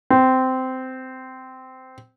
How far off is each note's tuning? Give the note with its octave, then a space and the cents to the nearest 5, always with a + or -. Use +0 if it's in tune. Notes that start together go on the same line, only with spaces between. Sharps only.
C4 -15